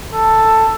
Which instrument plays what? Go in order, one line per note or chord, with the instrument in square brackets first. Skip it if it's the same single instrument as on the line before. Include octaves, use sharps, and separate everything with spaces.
[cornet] A4